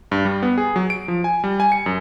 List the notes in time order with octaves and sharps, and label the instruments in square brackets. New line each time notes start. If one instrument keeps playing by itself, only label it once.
[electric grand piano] G2
G3
B3
G#4
F#3
D7
F3
G#5
G3
G#5
C#7
F#2